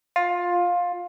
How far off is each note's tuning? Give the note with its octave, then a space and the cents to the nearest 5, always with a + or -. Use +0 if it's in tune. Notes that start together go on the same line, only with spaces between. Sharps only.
F4 +15